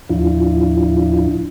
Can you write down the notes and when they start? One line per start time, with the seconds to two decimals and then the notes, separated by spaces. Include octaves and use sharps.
0.09 D#2 A2 F3 D4 E4 F4